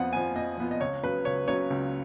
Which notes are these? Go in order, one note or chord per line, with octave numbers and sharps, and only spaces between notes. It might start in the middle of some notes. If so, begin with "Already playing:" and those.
Already playing: F2 F3 B3 F4 F#5
F3 B3 F4 G#5
F2 D#5
F3 B3 F4
D#5
C#2 C#5
C#3 F#3 B4
C#2 C#5
C#3 F#3 C#5
C#2